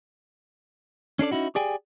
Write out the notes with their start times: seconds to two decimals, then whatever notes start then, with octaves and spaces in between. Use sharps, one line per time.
1.19 C#4 D4 A4 D5
1.31 C#4 D#4 E4 F#4
1.55 G4 G#4 D5 G5 G#5